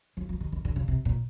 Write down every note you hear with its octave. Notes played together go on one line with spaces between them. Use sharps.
F3
F3
D#3
D#3
D3
C#3
C3
A#2